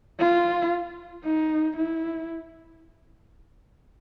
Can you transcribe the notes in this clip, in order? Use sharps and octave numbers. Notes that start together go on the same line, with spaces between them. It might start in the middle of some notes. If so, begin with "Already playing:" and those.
F4
D#4
E4